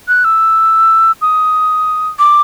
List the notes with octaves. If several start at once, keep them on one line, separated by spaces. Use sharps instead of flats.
F#6
E6
D#6
D6